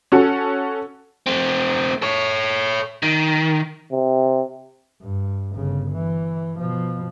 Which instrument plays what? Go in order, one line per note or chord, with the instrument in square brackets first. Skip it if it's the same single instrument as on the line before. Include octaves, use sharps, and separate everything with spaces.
[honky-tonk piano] C#4 F#4 A4
[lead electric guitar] A3 C4
A4 C#5
D#3
[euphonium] C3
[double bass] G2
G1 C#3
E3
B2 F3